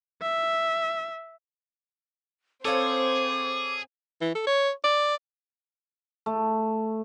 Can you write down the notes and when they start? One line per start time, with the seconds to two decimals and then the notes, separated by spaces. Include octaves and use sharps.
0.22 E5
2.65 C4 G#4 A4 C5 C#5 F5 D6
4.21 E3
4.35 A4
4.47 C#5
4.84 D5
6.26 A3